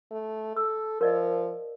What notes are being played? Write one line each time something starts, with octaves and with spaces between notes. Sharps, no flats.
A3
A4 E6
F3 A#4 D5 D#5